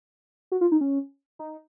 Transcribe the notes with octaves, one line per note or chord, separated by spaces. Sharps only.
F#4
F4
D#4
C#4
D#4